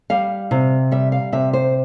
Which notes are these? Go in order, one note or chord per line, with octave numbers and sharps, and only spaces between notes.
G3 F5
C3
G3 E5
F5
C3 E5
C5